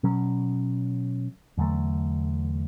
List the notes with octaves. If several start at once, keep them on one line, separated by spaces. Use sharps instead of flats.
B2 F#3 C#4
E2 D3 F#3 A3